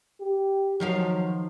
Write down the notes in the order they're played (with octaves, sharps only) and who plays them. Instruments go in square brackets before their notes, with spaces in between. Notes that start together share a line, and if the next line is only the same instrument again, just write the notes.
[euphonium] G4
[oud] D#3 F3 F5 [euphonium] F#3